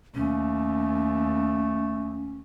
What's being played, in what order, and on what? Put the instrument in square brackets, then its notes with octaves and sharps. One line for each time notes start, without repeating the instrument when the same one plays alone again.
[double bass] D#2 [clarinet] A3 [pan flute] C#4